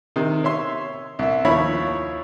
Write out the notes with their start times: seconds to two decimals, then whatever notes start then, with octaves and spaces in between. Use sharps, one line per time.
0.16 C3 D#3
0.44 C#5 E5 C6
1.19 C2 E5
1.45 D#2 F3 E4 C#5 B5